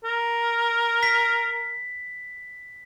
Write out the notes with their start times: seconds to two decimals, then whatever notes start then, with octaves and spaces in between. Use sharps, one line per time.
0.05 A#4
1.03 B6